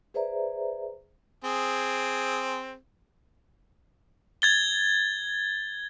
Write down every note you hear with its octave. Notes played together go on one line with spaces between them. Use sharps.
G#4 B4 C5 D5 E5 A#5
C4 G#4
G#6 A6 G7